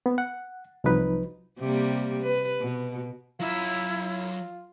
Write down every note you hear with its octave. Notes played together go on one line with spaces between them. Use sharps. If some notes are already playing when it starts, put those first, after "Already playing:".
B3
F#5
C2 F3 F#3 D#4 B4
C3 G3 A#3
B4
B2
F#3 E4 F4 E5